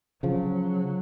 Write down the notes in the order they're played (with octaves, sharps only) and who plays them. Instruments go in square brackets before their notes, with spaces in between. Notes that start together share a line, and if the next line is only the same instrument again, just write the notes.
[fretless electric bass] C#3 F3 [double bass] F#3